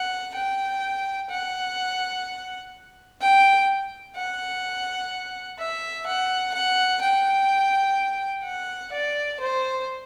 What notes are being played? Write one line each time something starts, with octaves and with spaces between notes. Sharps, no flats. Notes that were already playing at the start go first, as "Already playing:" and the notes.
Already playing: F#5
G5
F#5
G5
F#5
E5
F#5
F#5
G5
F#5
D5
C5